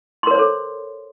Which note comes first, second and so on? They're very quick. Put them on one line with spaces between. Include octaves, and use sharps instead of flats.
C6 A#4 C#5 C5 A4